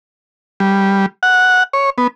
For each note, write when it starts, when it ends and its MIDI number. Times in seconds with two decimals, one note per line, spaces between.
0.60 1.06 55
1.23 1.63 78
1.73 1.90 73
1.98 2.07 59